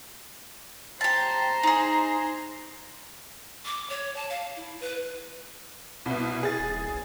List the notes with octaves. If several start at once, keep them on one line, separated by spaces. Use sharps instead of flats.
G4 C5 A5 A#5
D#4 G#4
D6
C#5
A5
F5
E4
B4
C2 B2 E4
G#4 A6
D#1
B1